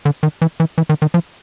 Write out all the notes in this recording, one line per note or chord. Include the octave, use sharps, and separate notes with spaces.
D3
D#3
E3
E3
E3
D#3
D#3
F3